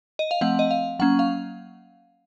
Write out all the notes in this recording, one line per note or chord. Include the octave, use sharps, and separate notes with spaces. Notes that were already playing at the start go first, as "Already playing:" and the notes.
D#5
F5
F3 A3 C4 F#5
D#5
F5
F#3 A#3 C#4 F#5
F5